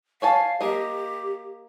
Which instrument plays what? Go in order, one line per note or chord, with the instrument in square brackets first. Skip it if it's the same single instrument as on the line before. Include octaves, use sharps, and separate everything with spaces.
[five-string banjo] C#5 G#5 A5 [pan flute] F5
[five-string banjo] A#3 D#5 [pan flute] G4